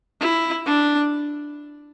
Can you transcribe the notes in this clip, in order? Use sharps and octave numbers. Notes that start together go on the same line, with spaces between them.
E4
D4